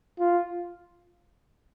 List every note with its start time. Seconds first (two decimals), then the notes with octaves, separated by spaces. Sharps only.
0.19 F4